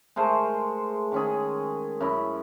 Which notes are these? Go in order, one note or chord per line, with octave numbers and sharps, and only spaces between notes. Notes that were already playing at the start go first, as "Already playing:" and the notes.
G#3 A3 A#4 C5
D#3 C#4 G#4
F#2 E4